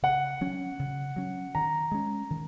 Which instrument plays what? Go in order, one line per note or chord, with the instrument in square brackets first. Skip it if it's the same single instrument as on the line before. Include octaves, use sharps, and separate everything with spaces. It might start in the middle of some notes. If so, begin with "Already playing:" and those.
[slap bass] C#3 [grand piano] F#5
[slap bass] F#3 C#4
C#3
F#3 C#4
[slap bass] D#3 [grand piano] A#5
[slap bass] G#3 C#4
D#3